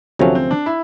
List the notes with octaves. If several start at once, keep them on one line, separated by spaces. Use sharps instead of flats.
D2 C3 F3 F#3 A3 C#4
C4
D4
E4